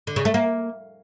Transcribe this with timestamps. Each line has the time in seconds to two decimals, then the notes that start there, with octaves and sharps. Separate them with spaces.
0.07 D3
0.16 C#3
0.25 A3
0.34 A#3